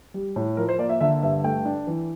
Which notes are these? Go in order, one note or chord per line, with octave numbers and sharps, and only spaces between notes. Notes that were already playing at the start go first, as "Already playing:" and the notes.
G3
A2
F3 A#4
C5
A#3 D5
E5
D3 E5
G2 E5
A3 G5
D4
E3